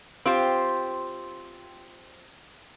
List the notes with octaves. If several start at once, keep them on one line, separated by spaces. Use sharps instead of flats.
C4 F4 G4 C5